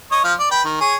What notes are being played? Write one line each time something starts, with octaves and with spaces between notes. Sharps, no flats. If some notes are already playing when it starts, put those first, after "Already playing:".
C#5 D#5
F3 F5
D5
B4 G5
D#3
G#4 C#5